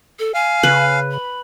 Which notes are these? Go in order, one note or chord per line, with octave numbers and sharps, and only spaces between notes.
A4
F5 G#5
C#3 B4
B5